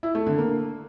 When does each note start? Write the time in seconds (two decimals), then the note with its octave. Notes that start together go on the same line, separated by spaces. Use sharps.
0.03 E4
0.15 A3
0.26 D3
0.38 A#3